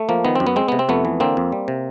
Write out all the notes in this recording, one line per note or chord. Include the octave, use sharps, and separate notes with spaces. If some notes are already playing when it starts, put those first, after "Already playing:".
Already playing: A3
F3 A#3
D#3 B3
F#2 C4
B3
G#3 C4
C3 B3
C4
F2 A3 B3
E3
D3 A#3 C4
F2
G3
C3